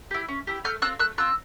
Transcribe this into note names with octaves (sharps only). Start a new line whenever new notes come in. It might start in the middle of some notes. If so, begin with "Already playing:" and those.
E4 G4
C#4
E4 G4
A3 F6 G6
C4 F4 E6 F#6
A3 E6 F#6
C4 F4 E6 F#6